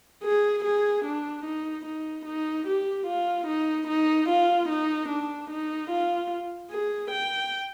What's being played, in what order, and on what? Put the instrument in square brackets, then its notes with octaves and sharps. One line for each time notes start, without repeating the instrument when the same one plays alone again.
[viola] G#4
G#4
D4
D#4
D#4
D#4
G4
F4
D#4
D#4
F4
D#4
D4
D#4
F4
G#4
G5